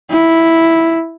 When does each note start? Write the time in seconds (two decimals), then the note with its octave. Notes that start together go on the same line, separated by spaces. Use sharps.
0.11 E4